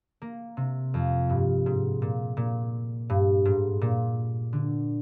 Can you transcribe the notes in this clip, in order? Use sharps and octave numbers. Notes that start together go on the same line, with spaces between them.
A#3
C3
F2
G2
G#2
A#2
A#2
G2
G#2
A#2
D3